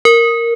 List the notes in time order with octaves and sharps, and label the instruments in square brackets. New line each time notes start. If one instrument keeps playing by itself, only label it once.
[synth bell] A#4